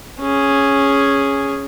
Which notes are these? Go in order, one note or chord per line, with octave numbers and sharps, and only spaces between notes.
C#4 G#4